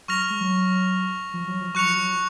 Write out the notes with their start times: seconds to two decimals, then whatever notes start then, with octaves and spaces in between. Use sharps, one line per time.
0.08 F#3 C#6 F6 A#6 F7
0.30 G#3
0.41 F#3
1.34 F3
1.47 F#3
1.61 F3
1.74 F#3 C#6 F#6 C#7 F7
1.85 F3
1.95 F#3
2.12 F3